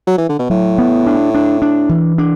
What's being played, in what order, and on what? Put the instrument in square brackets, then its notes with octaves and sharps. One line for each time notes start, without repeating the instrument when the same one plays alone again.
[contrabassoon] F#3
E3
D3
B2
[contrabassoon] A2 [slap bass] F#3
[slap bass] B3
D4
D4
D4
E3
D4